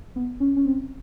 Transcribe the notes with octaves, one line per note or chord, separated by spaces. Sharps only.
B3
C#4
C#4
C4